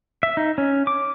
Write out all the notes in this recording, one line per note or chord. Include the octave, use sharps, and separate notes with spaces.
E5
D#4
C#4
D6